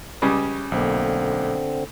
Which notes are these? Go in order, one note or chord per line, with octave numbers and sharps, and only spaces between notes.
C#2 C#3 G3
B1 D3 A#3 C4